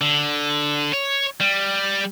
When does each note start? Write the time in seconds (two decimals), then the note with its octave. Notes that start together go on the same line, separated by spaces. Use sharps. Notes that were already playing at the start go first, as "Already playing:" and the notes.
0.01 D3
0.92 C#5
1.40 G3